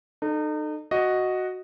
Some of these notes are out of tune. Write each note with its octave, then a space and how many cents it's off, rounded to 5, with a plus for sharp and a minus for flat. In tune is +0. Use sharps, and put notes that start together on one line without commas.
D#4 -35 A4 +0
F#4 +0 D#5 +0